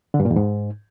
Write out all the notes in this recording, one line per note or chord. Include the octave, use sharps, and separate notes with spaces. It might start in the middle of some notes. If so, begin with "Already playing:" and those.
D3
G2
A#2
E2
G#2